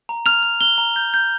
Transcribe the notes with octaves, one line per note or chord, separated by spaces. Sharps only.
A#5
F6 F7
F6
F6 G7
A#5
G6
G6